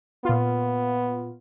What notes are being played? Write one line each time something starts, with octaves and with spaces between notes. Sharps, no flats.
A#2 B3 F4